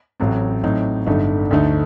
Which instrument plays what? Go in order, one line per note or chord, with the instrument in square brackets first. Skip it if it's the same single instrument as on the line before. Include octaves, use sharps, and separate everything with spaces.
[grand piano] A1 A2 F#3 C4
A2 F#3 C4 D#4
G1 G2 D3 A3 D#4
D2 D3 A3 D#4